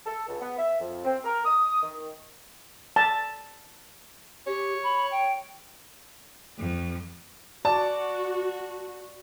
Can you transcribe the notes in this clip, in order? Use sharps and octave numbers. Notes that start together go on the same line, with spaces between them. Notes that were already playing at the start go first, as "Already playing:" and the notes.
A4
C#2
B3
E5
F2
C4
A#4
D#6
D#3
A5
G4 C#5
B5
G5
F2
F#4 D5 A5